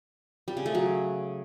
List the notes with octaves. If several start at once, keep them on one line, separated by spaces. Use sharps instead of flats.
G3
C#3
A3
F#3